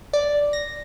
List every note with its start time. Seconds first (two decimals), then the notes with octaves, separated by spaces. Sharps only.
0.13 D5
0.53 A#6